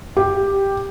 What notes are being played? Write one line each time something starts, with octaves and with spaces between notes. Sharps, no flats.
G4